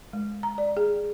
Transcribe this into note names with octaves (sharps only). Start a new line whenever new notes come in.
G#3
A#5
D5
G#4